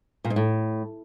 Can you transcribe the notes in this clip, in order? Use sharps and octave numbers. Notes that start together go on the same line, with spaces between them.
A#2
G#2
A2